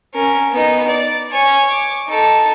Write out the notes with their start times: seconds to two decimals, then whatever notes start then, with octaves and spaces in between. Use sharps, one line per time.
0.14 C#4 A#4
0.52 B3 D#4
0.88 D5
1.31 C#5 G#5
1.71 D6
2.08 D#4 A4